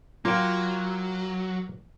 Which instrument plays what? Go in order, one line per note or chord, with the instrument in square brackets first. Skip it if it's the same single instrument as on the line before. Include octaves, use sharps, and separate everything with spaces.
[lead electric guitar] F#3 [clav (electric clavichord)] A#3 G5 [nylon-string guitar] F4